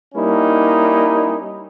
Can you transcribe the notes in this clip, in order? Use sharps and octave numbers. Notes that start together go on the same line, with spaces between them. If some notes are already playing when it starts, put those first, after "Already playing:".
G3 A#3 C#4 D#4 E4